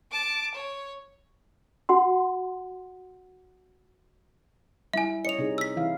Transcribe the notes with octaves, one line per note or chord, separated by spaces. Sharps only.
A5 D6
C#5
F#4 F#5 C6
G3 E4 E5 G#5
C#5 D#5 C#7 F7
C3 D#4 G#4
E6 B6
E3 E4 F5